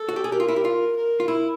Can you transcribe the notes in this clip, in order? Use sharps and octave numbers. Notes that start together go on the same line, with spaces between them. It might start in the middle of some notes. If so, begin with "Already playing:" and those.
Already playing: A4
F#4
G4
G#4
G4 A#4
F4
E4
G4
F4
A#4
F4
E4